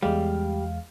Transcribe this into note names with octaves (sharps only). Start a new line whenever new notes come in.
E2 G3 G#3 F5